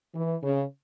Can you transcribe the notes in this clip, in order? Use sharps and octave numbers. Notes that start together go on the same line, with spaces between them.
E3
C#3